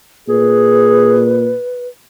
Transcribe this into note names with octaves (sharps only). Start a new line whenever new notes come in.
A#2 G#4 B4